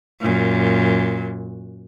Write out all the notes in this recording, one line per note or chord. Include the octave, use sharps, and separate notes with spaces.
F#2 A#2